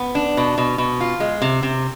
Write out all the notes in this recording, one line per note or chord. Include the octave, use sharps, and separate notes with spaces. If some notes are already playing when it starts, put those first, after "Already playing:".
Already playing: B3
D4
B2
B2
B2
F4
G#3
C3
C3